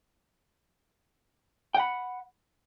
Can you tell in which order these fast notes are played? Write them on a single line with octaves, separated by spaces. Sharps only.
G5 F#5 B5